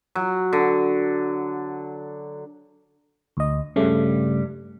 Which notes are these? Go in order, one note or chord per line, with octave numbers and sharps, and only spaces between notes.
F#3
D3
D2 D#5
G2 C#3 G3 A3